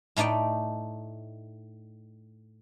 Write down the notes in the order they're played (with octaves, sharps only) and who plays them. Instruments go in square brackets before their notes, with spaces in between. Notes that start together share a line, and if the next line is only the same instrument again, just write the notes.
[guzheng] A2 A3 D#4 D5 G5